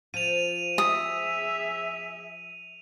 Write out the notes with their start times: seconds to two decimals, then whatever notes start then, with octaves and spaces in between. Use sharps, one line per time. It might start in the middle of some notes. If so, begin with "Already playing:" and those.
0.14 F3 D#7 F7
0.78 G#4 E5 D#6